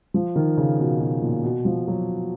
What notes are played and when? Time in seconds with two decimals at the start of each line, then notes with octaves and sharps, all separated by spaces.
0.14 F3
0.36 D#3
0.57 C#3
0.79 B2
1.00 B2
1.22 A#2
1.44 B2
1.65 F3
1.88 F#3